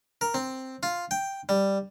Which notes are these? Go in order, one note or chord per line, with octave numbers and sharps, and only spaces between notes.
A#4
C4
F4
G5
G3